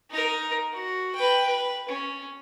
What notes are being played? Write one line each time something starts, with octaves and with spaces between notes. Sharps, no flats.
D#4 A#4
F#4
B4 G5
B4
C#4